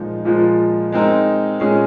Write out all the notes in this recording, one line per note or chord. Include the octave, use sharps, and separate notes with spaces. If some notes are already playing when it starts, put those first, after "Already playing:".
Already playing: A#2 F3 G#3 D#4
A#2 F3 G#3
G#3 C4 D#4 A#4
A#2 G#3 C#4 G#4